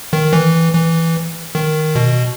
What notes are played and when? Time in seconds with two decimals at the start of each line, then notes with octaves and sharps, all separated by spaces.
0.13 D#3
0.33 E3
0.73 E3
1.55 D#3
1.95 B2